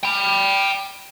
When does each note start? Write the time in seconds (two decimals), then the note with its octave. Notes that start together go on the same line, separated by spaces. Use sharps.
0.04 G5 B5